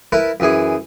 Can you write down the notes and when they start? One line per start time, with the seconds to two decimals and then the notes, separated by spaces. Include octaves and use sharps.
0.12 E4 A#4 B4 A5
0.40 F#2 E3 G#4